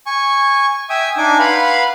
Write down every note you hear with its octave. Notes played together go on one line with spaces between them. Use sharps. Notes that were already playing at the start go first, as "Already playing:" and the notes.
G#5 C#6
E5 G5 G#5 D#6
D4 D#4 G#5 D6
B4 F5 F#5 B5 C6